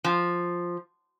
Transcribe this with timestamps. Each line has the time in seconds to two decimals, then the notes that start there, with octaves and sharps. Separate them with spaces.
0.04 F3